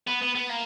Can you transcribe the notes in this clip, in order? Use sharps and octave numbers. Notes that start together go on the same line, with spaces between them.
B3
B3
B3
A#3